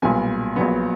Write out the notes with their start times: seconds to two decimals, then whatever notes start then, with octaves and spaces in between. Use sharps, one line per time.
0.02 B1 A#2 G3 B3 G#5
0.56 A#1 A#2 F#3 B3